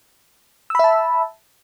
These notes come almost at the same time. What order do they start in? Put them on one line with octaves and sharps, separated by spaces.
E6 B5 E5 A5